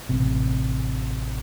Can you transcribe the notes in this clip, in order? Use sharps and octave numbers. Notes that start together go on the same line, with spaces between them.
A1 C3